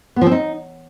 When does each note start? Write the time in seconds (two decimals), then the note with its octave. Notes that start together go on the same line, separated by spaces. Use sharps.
0.16 B3
0.21 F3
0.27 C4
0.32 D#4